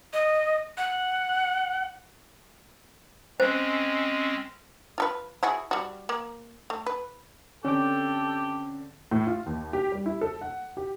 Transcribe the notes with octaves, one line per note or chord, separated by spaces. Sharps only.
D#5
F#5
G#3 C4 C#4 C5
F4 A4 B4
E4 F#4 G#4
G3 F#4
A#3
A3
B4
D3 C4 C#4 G4 A4 G5 D6
A2
F4
D#2
G4
G3
E4
A4
F#5
G4